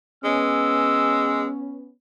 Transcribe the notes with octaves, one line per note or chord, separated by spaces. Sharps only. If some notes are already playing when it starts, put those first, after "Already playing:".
G#3 B3 C#4 E6